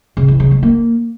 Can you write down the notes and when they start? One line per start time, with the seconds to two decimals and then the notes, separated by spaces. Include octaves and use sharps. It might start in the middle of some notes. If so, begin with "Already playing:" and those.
0.17 C#3
0.28 E3
0.40 C#3
0.51 G#3
0.63 A#3